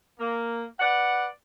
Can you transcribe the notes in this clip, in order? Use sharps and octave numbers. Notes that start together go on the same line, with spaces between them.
A#3
B4 D5 F#5